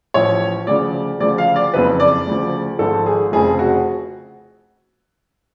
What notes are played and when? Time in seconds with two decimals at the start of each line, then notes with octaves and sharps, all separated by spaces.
0.14 A1 A2 F3 C#5
0.67 D2 C#3 F3 D5
1.20 D2 C#3 F3 D5
1.38 F5
1.56 D5
1.74 F#1 F2 C#3 B4
2.00 D5
2.27 D2 C#3 F3
2.79 G#1 G#2 F3 A4
3.06 G#4
3.32 F1 F2 C#3 F3 G#4
3.59 F#4